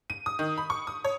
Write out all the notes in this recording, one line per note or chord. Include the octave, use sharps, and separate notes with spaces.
D#7
D#6
D#3
B5
C#6
D#6
C#5